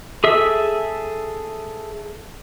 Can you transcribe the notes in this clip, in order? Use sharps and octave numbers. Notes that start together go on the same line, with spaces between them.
G#4 A4 E5 E6